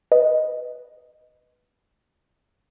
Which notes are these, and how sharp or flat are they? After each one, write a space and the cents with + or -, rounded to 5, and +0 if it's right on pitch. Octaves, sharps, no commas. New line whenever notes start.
B4 +0 D#5 +0